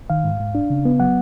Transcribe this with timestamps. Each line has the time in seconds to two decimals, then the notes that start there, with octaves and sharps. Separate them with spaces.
0.10 D#3 F5
0.24 G#2
0.40 G#2
0.55 D4
0.70 C#3
0.85 B3
1.00 F#3 F#5